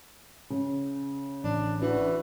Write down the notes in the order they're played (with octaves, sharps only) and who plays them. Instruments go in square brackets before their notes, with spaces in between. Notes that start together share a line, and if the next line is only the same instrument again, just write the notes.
[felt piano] C#3
[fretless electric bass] A1 [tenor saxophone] D4
[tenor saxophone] E3 [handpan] D4 F#4